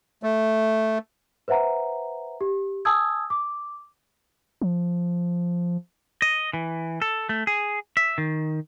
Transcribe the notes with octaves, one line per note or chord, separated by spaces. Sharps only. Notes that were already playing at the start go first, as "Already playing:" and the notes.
A3
B4 C5 E5 F#5 A#5
G4
G#5 A5 D#6 E6 G#6
D6
F3
D#5
E3
A4
A3
G#4
E5
D#3